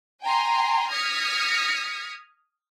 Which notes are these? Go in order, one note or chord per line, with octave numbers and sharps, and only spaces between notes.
G5 G#5 A#5 C6
D#6 F6 G#6 A#6 B6 C#7